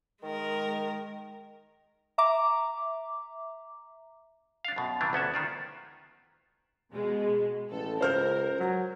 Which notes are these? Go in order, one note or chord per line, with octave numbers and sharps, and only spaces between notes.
D#3 G#3 A#4
E5 A#5 D6
D4 F5
F#2 B2
G2 C3 E3 G3 D4
D2 B3 C#4 E5
D#3 F4 D5
B2 G#3
A1 A4
C#2 A#4 C5 F6 G6
F#3